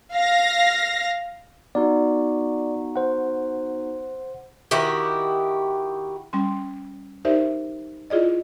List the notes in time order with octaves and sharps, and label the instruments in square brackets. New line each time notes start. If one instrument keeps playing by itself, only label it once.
[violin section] F5 A#6
[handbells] B3 D#4 F#4 [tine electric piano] D5
[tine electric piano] C5 F#5
[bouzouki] D#3 E4 F#4 G4
[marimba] G3 C#4 C6
D#4 G4 A#4 C5 D5 E5
E4 F4 G#4 D5 D#5